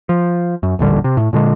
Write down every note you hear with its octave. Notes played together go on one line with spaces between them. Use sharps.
F3
F#2
D#1 A1 D3 G3
C3
A2
A#2 D3 G#3